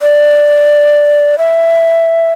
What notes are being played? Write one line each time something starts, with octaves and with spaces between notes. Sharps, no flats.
D5
E5